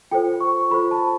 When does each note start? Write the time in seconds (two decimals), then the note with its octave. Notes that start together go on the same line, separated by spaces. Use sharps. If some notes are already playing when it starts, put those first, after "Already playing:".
0.11 F4 A4 C5 G5
0.41 C#6
0.71 F4 A4 C5 B5
0.91 A5